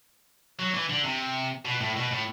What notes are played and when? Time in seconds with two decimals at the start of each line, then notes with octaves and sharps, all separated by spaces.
0.59 F#3
0.74 E3
0.89 D3
1.05 C3
1.65 B2
1.81 A2
1.97 B2
2.11 A2